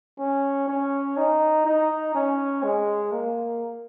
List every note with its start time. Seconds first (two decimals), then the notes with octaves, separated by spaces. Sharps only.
0.19 C#4
0.68 C#4
1.17 D#4
1.65 D#4
2.15 C#4
2.64 G#3
3.13 A#3